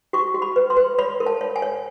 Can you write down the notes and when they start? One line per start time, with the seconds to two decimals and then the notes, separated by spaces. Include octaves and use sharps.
0.13 F#4 C#6
0.34 F#4
0.42 B5
0.56 B4
0.70 C6
0.77 B4
0.98 C#5 B5
1.20 A#4
1.26 A5
1.41 C#5
1.56 G#5
1.62 C#5